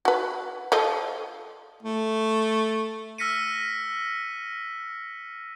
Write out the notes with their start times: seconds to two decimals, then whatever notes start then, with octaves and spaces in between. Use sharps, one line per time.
0.05 F#4 B4
0.72 F3 A4 D#5
1.83 A3
3.18 E6 F6 A#6 B6 C#7 D#7